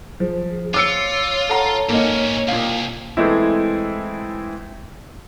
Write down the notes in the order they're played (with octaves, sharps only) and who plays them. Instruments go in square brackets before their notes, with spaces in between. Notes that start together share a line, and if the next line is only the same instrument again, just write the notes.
[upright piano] F3 [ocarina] G#4
[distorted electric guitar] F4 [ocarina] C#5 [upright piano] D6 E6 C#7
[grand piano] A4 F#5 A#5
[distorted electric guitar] G#2 C#4 [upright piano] A#3 D#4
[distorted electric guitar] C2 [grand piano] A#2 F5
[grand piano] E3 G#3 A3 C4 E4